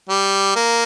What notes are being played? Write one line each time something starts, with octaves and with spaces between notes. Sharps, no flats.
G3
A#3